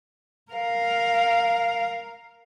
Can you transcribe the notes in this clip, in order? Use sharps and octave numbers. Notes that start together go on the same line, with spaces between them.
A#4 F5